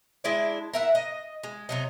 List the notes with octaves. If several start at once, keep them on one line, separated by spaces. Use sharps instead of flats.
G#3 D4 E4 D5
A#4 E5 F#5
D#5
G#3
C3 F#3 D#4